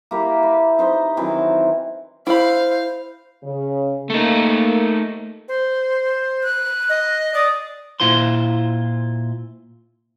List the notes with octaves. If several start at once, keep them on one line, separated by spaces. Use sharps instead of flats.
A#3 E4 G4 A#4
B4
D#4 C5 D#5
D#3 E3 F#3 C4
E4 C5 F5 B5
C#3
A3 A#3 D#4
C5
F#6
D#5
D5 D#6
A#2 E4 F4 C5 C6